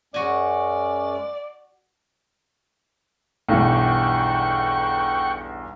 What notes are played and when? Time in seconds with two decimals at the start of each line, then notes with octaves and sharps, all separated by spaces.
0.14 F#2 G#3 C#4 F#4 D5 G#5
3.49 B1 E2 G2 F#5 G5 C#6